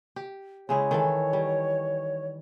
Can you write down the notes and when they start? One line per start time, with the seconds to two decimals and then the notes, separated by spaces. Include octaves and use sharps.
0.16 G4
0.69 C#3 G#3 E4 C#5
0.91 D#3 E3 A4
1.33 G3